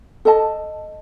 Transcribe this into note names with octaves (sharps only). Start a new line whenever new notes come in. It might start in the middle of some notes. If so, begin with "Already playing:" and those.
A4 D#5 A5